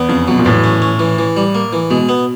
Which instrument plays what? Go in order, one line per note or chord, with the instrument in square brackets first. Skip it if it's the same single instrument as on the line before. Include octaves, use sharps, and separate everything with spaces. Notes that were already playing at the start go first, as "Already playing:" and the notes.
Already playing: [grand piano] E2 [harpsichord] B3
[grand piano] F2 [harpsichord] C#3
[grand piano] B2 [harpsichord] F#3
[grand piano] A#2
[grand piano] A2 [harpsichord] E3
[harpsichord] C#4
C#4
E3
E3
G3
A#3
E3
[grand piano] B2 [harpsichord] G#3
[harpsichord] B3